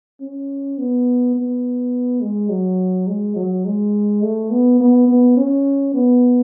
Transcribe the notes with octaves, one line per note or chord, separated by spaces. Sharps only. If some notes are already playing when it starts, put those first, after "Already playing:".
C#4
B3
B3
G#3
F#3
G#3
F#3
G#3
A3
B3
B3
B3
C#4
B3